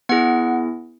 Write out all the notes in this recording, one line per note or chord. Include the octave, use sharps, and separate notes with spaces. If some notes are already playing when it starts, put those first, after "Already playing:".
B3 E4 G#4 F#5